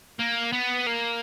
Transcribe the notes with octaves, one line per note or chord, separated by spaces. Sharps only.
A#3
B3
A#3